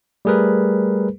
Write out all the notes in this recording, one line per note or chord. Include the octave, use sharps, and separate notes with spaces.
G3 A3 G#4 A#4 B4